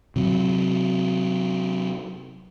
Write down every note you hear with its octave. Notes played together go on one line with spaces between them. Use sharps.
C3 F#3